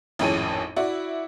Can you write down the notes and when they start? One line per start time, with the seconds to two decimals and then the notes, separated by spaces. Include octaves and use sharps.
0.19 G#1 F2 A2 C#4 G#4 D#7
0.76 E4 F#4 D5